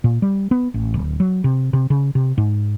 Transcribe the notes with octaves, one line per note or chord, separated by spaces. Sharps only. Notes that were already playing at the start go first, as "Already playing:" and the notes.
A#2
G3
B3
A1
D1
F#3
C3
C3
C#3
C3
G#2